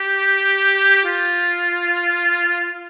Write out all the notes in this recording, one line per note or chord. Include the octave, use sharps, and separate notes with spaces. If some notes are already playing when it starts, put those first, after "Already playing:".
Already playing: G4
F4